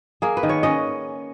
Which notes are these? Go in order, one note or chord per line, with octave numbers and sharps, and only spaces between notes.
A#3 G#4
B4
D#3
C#5
C#4 D#5